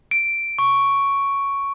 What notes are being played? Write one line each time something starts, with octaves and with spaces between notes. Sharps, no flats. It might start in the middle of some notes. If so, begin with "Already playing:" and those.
D7
C#6